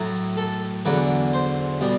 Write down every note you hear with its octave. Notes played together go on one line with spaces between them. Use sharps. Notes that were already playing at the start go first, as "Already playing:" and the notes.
Already playing: A2 F#3
A4
E2 D3 F#3 B4
C5
B2 G3